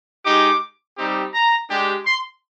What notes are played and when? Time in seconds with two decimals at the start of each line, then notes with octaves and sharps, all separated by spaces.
0.25 G#3 D#4 G4 D6
0.97 G3 C4 D#4 G4
1.34 A#5
1.69 G#3 D4 G4
2.05 C6